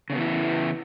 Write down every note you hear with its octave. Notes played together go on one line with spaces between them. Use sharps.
C#3 E3 B3 C#4 E4